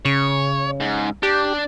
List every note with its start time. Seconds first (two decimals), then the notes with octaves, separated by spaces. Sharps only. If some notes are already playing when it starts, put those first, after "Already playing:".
0.05 C#3 C#5
0.80 G#2
1.23 D4 G4